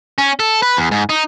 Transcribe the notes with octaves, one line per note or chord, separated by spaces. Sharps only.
C#4
A4
B4
E2
G#2
D#4